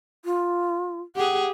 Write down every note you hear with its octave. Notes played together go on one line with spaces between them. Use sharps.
F4
G4 G#4 F#5